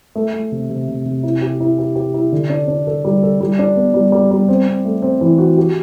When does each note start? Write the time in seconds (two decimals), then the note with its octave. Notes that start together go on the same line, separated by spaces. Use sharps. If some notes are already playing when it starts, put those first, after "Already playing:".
0.16 A3
0.33 A3
0.52 C3
0.70 C3
0.88 C3
1.05 C3
1.23 E4
1.41 G4
1.60 E4
1.79 G4
1.95 G4
2.14 E4
2.32 D3
2.50 D4
2.68 D4
2.87 A4
3.05 G3
3.23 A4
3.41 G3
3.59 D4
3.76 B3
3.94 G3
4.12 G3
4.31 G3
4.48 C4
4.67 C4
4.85 A3
5.02 C4
5.21 E3
5.38 F#4
5.58 G4